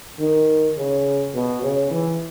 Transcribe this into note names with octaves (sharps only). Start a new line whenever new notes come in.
D#3
C#3
B2
C#3
E3